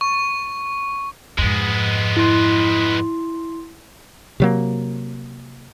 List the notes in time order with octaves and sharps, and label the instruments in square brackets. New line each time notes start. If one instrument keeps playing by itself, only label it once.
[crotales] C#6
[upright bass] F2 G#2 [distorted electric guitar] G#3 B3
[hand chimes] E4 C6
[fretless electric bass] C3 F#3 A#3